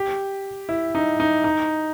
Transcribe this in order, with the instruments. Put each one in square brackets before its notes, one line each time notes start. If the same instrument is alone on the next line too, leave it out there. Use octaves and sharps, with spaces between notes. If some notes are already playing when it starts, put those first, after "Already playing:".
Already playing: [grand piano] G4
E4
D#4
D#4
D#4